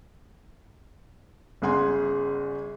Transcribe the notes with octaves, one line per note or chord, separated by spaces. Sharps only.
G1 C#3 G#4 F#5 C6